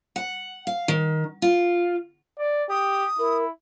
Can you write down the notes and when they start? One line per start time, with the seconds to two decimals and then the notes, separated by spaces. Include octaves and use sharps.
0.16 F#5
0.67 F5
0.88 D#3
1.42 F4
2.38 D5
2.70 G4 D#6
3.19 E4 A#4